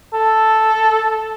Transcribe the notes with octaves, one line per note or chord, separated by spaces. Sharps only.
A4